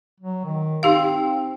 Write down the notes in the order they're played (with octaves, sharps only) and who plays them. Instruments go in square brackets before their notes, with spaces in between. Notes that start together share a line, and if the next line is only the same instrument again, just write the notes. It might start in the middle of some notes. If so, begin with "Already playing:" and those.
[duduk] F#3
D#3
[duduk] C4 [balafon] D#4 G4 F5